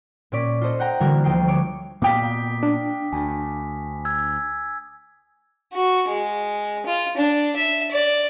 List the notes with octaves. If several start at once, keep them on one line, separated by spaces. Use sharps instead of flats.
A#2 C#4 D5 B6
F4 A4 C5 D#5
F#5 G5 A#5
D3 E3 G3 A#3 F#4 A#4
D2 F3 D#5 G5 C7
C#5 D6
A#2 B3 F5 G5 D6 D#6 B6
D4
D2 G#5
E6 G#6
F#4
G#3
F4
D4
E5
D5